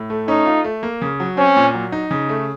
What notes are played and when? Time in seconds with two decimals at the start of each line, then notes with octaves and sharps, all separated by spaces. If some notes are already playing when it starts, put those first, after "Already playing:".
Already playing: A2
0.10 A3
0.28 C#4 D#4
0.46 F4
0.64 A3
0.83 A#3
1.01 C#3
1.20 F#3
1.37 C4 C#4
1.56 A#2
1.74 F#3
1.92 D#4
2.11 C#3
2.29 A3